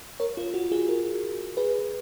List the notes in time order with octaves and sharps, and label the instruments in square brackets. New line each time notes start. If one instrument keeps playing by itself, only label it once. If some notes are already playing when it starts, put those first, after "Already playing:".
[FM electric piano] A#4 C#5
F4
F#4
F4 G#4
F#4 A#4
G#4 B4